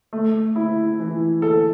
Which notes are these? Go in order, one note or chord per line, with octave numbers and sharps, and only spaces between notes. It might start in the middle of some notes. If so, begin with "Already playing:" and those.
A3
E4
E3
A4